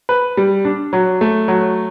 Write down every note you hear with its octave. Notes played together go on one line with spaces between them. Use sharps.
B4
G3
D4
F#3
A3
F#3